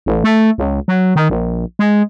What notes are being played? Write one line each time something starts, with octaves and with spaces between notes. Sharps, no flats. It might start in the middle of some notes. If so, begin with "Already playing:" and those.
A1
A3
C#2
F#3
D#3
A#1
G#3